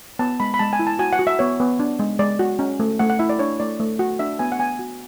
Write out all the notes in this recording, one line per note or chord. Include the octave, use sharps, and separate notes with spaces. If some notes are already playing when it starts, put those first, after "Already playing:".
B3 A5
G#3 B5
B5
G#3 A5
G#5
E4
A5
F#4 G#5
F#5
F#4
E5
B3 C#5
B3
D4
G#3
G#3 D5
F#4
C#4
A3
A3 F#5
F#5
E4 E5
D5
D4 C#5
A3 D5
A3
F#4
D4 E5
B3 G#5
F#5
B3 G#5
F#4